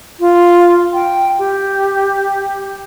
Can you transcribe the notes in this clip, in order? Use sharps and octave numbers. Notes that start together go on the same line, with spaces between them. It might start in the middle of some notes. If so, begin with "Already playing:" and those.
F4
G5
G4